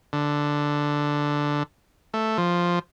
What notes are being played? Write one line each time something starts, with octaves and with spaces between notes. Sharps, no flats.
D3
A3
F3